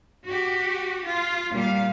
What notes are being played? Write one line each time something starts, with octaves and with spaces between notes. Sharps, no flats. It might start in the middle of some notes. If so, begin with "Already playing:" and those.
F#4 G4
F4
A#2 G3 F5